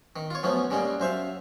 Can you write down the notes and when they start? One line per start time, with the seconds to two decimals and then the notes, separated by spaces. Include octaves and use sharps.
0.16 D#3
0.30 F4 C#5
0.43 F#2 F3 A3 B3 C#4
0.70 C#3 G3 G#3 A#3
1.00 F#2 C5 E5 F5